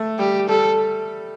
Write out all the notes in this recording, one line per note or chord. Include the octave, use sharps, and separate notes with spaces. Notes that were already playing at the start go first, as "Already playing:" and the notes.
Already playing: A3
G3 G4
G3 A4